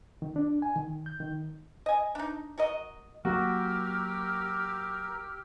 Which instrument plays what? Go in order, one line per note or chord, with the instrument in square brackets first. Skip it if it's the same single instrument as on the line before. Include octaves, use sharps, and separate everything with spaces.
[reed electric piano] D#3
D4
G#5
D#3
G6
D#3
[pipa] D#5 G#5
D4 D#4
F#4 A#4 D#5
[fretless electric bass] F#3 A#3 [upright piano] F#4 [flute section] G4 E6 F6 [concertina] A#4